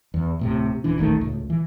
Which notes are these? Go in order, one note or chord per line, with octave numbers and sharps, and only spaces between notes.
E2
D1 A2 C3
D#1 E3 D4
D#1 A1 D#3 A3
C#2 A2
E3